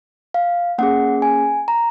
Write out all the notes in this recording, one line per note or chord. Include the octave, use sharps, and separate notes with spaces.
F5
A#3 C#4 G#4 F#5
G#5
A#5